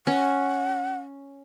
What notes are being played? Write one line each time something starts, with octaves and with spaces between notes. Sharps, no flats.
C#4 F#5